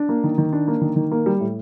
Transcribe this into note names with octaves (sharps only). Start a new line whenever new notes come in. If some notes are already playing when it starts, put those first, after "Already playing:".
Already playing: D4
A#3
D#3
D#3
D4
A#3
D#3
D#3
A#3
G3
A2